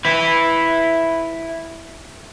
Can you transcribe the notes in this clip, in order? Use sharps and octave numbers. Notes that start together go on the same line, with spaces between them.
E4 B4